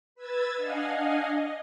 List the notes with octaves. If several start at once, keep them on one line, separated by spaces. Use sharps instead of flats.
B4 E6 G#6 A6
D4 D#5 F5 F#5 G#5
D#5